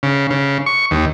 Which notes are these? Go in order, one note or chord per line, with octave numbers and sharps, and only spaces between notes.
C#3
C#3
C#6
D#2